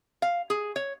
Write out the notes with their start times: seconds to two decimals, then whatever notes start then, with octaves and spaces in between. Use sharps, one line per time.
0.22 F5
0.50 G#4
0.76 C#5